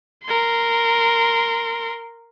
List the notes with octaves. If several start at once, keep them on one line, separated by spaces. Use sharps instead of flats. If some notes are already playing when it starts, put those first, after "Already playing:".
A#4 C6